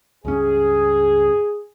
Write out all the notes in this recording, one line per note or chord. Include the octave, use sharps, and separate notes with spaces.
C#2 G2 C#4 G#4